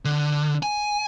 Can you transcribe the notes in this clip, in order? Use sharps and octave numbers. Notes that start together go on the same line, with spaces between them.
D3
G#5